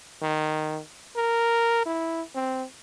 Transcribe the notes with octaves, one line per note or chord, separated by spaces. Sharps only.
D#3
A#4
E4
C4